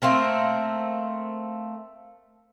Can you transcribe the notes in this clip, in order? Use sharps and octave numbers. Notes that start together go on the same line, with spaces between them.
A3 A#3 C4 A#4